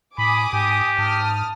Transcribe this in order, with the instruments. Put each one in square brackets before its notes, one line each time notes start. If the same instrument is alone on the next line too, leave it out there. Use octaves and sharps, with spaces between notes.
[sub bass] A2 [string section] G#5 D6 D#6 [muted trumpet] B5
[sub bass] G#2 [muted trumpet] G4
[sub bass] G#2 [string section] A5 D#6 F6